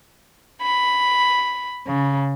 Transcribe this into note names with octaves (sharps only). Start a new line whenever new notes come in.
B5
C#3